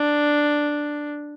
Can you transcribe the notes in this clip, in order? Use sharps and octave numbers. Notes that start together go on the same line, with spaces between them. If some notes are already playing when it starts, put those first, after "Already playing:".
Already playing: D4